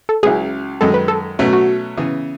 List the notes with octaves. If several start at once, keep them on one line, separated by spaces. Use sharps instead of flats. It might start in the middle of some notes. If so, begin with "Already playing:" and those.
A4
C#2 C#3 F#3 C#4 E4 G#4
F#2 D#3 G#3 A4
B4
A4
B2 F#3 A3 C#4 F#4
F#4
C#3 E3 B3